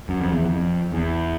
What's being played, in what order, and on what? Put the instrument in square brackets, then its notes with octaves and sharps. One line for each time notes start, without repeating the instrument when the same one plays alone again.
[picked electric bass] F#2
F2
E2
F2
E2